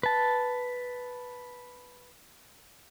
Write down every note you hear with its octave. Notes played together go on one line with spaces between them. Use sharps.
B4 A5